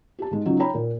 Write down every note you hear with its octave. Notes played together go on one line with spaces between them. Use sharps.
G4 A5
G#2 G#3
C#3 F#3 D#4 F4
C#5 G5 A#5 B5
A#2 A#3